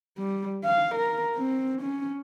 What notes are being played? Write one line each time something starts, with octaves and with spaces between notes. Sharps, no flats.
G3
F5
A#4
C4
C#4